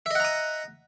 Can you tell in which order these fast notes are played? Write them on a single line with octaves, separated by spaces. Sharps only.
E5 D#5 F#5 A#5 D#6